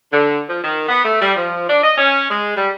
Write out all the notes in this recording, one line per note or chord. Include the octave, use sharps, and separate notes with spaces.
D3
F3
D#3
B3
A3
G3
F3
D4
D#5
C#4
G#3
G3